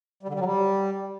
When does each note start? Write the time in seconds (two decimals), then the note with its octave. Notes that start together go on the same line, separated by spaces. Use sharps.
0.23 G3
0.28 D3
0.34 G3
0.40 F#3
0.45 G3